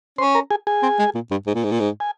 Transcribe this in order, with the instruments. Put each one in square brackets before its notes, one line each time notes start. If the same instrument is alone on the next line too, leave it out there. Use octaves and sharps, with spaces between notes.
[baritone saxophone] C#4 [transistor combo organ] C5 C6
[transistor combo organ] A#4 A#5
G#4 G#5
G#4 G#5
[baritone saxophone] C4
G#3
A#2
G2
G#2
A#2
G#2
A#2
G#2
[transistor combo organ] G#5